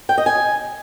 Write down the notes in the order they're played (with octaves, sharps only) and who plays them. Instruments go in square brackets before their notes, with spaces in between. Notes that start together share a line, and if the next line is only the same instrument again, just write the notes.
[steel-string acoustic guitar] G5
D#5
G#5